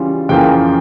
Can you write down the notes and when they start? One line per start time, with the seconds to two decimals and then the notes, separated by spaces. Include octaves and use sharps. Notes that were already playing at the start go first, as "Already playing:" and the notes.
Already playing: C#3 E3 G3 C#4 F4
0.29 F2 C#3 E3 A#3 F4 G5